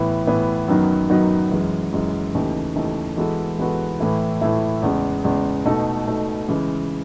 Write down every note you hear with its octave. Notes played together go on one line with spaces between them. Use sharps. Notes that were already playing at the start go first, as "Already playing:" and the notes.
Already playing: A2 E3 B3 E4
A2 E3 B3 E4
F#2 D#3 F#3 B3 D#4
F#2 D#3 F#3 B3 D#4
F#2 E3 G#3
F#2 E3 G#3
D#2 C#3 E3 A3 D#4
D#2 C#3 E3 A3 D#4
E3 G#3 B3 F#4 A4
E3 G#3 B3 F#4 A4
A2 E3 A3 E4
A2 E3 A3 E4
E2 C#3 G#3
E2 C#3 G#3
B2 A3 D#4 A4
B2 A3 D#4 A4
C#3 E3 G#3